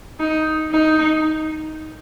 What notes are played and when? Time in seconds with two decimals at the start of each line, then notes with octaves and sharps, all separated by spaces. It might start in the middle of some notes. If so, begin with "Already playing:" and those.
0.20 D#4
0.71 D#4